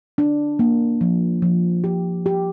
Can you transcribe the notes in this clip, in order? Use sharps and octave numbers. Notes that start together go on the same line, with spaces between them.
D4
A#3
F3
F3
G4
G4